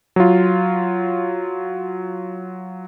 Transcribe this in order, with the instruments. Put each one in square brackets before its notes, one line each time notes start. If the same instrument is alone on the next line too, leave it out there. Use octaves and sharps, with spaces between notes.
[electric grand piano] F#3 F4